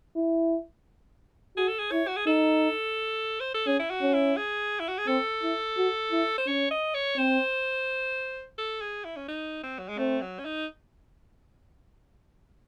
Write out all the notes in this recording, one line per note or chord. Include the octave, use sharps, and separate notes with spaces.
E4
F#4 G#4
A4
G#4
E4 C#5
F#4
G#4
D#4 A4
C5
A4
C#4 G#4
E4
F#4
C#4
E4
G#4
E4
F#4
G#4
C4 A4
E4
F#4
E4
C5
C#4 C#5
D#5
C#5
C4 C5
A4
G#4
E4
C#4
D#4
C4
F#3
G#3
A3 C4
F#3
C#4
D#4